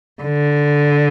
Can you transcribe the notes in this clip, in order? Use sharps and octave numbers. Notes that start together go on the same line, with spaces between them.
D3